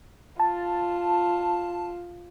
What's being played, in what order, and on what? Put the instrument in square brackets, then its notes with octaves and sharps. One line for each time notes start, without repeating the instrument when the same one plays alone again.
[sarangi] F4 [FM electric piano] A5